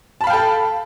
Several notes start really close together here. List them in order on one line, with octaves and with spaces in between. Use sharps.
A5 B5 F5 G5 A4